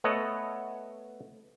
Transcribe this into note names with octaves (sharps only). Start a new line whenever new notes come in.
A3 B3 A4 C#5 D#5 F#5